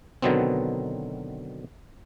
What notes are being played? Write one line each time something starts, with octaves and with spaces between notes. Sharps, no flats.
B2 D3 D#3 F#3 B3 C4